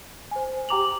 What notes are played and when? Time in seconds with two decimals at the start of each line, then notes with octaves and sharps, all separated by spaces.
0.31 C5 G#5
0.69 G4 G5 A#5 D6 F7 F#7